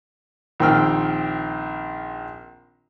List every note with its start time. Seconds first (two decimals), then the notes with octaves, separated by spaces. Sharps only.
0.60 A#1 D#3 C4 G5 E6 F6